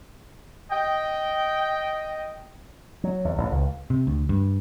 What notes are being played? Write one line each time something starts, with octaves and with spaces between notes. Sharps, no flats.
D#5 G5
F#3
E2
A1
C#2
C3
D2
G2